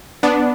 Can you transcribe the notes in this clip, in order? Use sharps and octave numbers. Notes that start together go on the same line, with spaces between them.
B3 D4